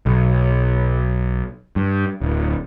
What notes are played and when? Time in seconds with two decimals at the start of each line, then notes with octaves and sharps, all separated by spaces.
0.06 B1
1.76 G2
2.21 D1